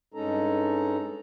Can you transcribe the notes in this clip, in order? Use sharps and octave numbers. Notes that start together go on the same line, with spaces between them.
G2 G#3 C#4 D#4 A4 A#5